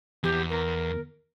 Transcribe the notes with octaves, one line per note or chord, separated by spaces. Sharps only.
E2 G4
A#4